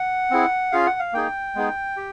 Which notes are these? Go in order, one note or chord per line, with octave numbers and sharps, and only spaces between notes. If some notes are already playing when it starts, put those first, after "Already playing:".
Already playing: F#5
C4 E4 G#4
C#4 F4 G#4 F5
F#5
F5
A#3 D#4 G#4 G5
G#3 B3 D#4 G#4
G4